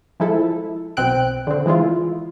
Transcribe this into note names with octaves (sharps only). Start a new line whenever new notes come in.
F3 G#3 E4 A4
B1 B2 C4 G5 F#6 D7
D3 C4
E3 G#3 E4 F4